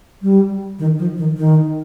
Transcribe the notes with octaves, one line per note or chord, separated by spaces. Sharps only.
G3
D#3
F3
D#3
D#3